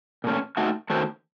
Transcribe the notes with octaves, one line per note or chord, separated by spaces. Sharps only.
A#2 A3 C#4
A3 D#4 F#4
D#3 A3 C#4 F#4 C5